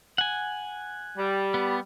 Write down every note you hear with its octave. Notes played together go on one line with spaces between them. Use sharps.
F#5 G#5
G3
B3